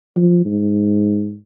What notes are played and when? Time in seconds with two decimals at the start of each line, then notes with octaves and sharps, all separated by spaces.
0.16 F3
0.45 G#2